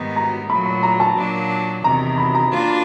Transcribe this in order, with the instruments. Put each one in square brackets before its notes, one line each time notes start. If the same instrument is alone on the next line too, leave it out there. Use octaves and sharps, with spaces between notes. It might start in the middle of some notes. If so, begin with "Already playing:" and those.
Already playing: [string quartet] G#2 D#3 G3 B3 D#4
[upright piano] A#5
[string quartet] A#2 F#3 A3 [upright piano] B5
[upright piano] B5
A#5
A5
[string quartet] A#2 F#3 A#3 D4
[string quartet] E2 C3 D#3 [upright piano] A#5
[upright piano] B5
A#5
[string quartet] A#3 D4 F4